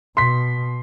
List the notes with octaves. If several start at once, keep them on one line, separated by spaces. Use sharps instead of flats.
B2 C6 B6